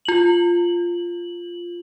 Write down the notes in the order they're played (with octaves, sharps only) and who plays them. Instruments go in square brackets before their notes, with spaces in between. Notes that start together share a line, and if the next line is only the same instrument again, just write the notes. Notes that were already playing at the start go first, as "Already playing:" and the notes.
[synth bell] F4 F#7